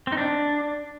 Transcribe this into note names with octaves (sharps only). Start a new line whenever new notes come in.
C4
D#4
D4